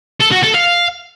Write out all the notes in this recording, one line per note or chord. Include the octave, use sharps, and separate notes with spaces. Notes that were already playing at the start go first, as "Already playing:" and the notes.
A4
F#4
A4
F5